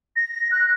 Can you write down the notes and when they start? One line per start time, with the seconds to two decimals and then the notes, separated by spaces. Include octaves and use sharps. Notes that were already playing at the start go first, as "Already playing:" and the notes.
0.16 A#6
0.51 F#6